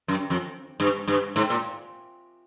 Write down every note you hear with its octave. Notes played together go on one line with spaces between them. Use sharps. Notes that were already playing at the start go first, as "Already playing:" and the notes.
F#2
F2
G2
G2
G#2
A#2